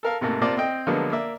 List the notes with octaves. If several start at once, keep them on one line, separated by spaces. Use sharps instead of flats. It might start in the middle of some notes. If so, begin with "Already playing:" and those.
A4 A#4 F5
G#2 C3 A3 A#3
C3 A#3 F4 C5 D5 A5
C4 D#5 G5
D3 F3 F#3 G#3 A#3 B3
A#3 D5 E5